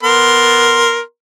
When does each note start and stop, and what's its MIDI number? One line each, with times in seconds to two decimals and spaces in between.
0.03 1.00 59
0.03 1.00 70
0.03 1.00 84